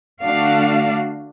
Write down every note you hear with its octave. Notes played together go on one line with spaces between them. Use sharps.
D3 A3 D4 F#4 F5